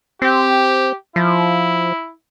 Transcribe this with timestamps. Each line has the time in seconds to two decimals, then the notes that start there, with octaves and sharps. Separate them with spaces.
0.22 C4 G4
1.16 F3 E4